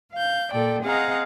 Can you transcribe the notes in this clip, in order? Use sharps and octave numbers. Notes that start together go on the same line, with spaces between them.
F5 G6
A#2 A4 D5 G5
C4 G#4 D#5 F5 F#5 A#5